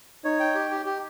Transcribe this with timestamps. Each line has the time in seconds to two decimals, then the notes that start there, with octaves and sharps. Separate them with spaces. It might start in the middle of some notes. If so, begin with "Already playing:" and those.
0.25 D#4 C#5
0.40 G5
0.55 G4
0.71 G4
0.86 G4